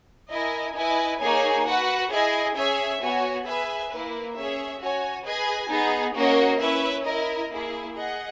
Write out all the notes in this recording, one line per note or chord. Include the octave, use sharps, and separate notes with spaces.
E4 A#4 D#5 G#5
E4 B4 D#5 G#5
A#3 D#4 G#4 C#5 G#5
F#4 B4 F#5
E4 G#4 D#5 G#5
C#4 G#4 C#5 E5 G#5
B3 F#4 C#5 G#5
G#4 B4 E5 G#5
A#3 E4 B4
C#4 G#4 C#5 E5
F#4 C#5 G#5
G#4 B4 D#5 G#5
B3 D#4 G#4
A#3 C#4 F#4 A#4 D#5
C#4 E4 B4 E5
E4 A#4 D#5
A#3 E4 G#4
G#4 D#5 F#5